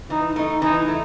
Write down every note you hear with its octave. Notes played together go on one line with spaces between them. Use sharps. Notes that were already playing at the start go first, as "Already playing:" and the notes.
E3 D#4
A3 D#4
E3 D#4
A3